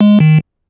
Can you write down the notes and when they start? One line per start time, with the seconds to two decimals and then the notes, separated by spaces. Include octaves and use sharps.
0.01 G#3
0.20 D#3